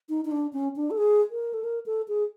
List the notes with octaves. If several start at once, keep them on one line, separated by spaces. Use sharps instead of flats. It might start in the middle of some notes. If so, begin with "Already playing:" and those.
D#4
D#4
D4
C#4
D4
A4
G#4
A#4
A4
A#4
A4
G#4